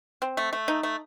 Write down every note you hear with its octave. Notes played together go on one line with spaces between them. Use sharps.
C4
A3
A3
D#4
A3